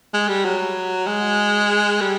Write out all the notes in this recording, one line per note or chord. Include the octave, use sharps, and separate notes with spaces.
G#3
G3
F#3
G#3
G3